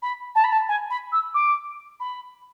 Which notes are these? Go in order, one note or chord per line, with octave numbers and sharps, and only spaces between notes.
B5
A5
B5
A5
G#5
B5
E6
D6
B5